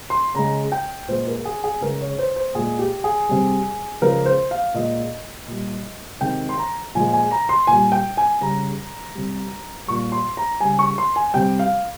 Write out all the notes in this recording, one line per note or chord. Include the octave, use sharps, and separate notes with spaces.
C6
C#3 G#3 A#5
G5
A#2 G#3 C5
A#4
G#4
G#4
C#3 G#3 A#4
C#5
C5
C5
A#2 G#3 G#4
G4
G#4
C3 G3
C#3 F3 G#3 A#4
C5
F5
A#2 G#3 D#5
A#2 G3
C3 D#3 G#3 G5
C6
A#5
A#2 F3 G#3 G#5
G#5
A#5
C6
A#2 G3 G#5
G5
G#5
C#3 G3 A#5
C3 G3
A#2 G3 C#6
C6
A#5
C#3 G3 G#5
C#6
C6
G#5
C3 G3 G5
F5